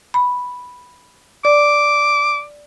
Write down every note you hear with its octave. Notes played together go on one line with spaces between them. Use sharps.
B5
D5 D6